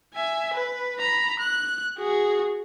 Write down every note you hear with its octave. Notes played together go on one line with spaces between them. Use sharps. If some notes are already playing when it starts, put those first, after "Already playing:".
E5 G#5
B4
A#5 B5
F#6
F#4 G#4